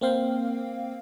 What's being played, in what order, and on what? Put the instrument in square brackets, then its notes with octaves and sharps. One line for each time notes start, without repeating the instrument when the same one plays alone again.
[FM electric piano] A#3 C4 F5 G5